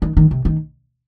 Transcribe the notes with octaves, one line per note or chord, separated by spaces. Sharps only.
D#3
D#3
C3
D#3